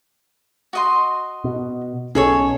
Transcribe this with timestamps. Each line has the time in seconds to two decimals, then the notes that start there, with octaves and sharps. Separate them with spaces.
0.73 F#4 D#5 C6
1.44 B2
2.15 B1 B2 C#4 G#4 A4 C#5